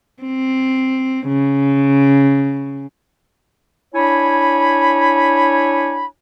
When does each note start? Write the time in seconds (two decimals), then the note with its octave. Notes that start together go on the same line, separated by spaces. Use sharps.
0.22 C4
1.27 C#3
3.93 D4 E4 C#5 G#5 B5